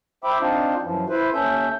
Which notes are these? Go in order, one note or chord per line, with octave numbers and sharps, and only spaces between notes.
C5 E5 G5 B5 D6
C4 D4 D#4 F4 C5
F#2 E3 F3
E4 B4 C5
D#2 C#4 A4 E5 G6